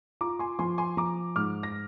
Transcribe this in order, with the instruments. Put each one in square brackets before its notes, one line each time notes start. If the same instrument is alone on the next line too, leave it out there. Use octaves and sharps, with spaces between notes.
[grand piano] F4 A#5 D6
G#5 C6
F3 G#5 C6
G#5 C6
F3 A#5 D6
G#2 D6 F6
A#6